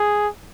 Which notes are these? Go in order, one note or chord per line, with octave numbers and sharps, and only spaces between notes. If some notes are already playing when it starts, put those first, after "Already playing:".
Already playing: G#4